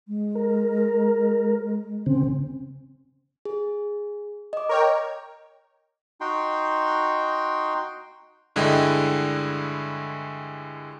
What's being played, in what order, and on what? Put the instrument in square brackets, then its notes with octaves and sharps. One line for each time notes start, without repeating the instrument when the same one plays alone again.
[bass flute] G#3
[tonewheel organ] A#4
[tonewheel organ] C#3 C4 [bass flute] C#4
[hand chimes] G#4
D#5 D6
[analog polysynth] A#4 C#5 G5
[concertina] D#4 F#4 G5 C6
[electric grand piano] G2 D3 G#3 E4 D#5 G5